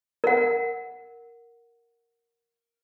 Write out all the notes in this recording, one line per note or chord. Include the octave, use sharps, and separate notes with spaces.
A#4 F#5